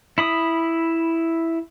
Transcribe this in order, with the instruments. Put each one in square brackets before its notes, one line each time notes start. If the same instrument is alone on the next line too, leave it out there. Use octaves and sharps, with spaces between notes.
[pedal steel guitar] E4 B5 D#6